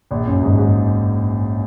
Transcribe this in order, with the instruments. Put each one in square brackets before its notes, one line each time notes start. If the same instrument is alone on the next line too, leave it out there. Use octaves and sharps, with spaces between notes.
[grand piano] A#1 A#2
F#2
G#2
G#2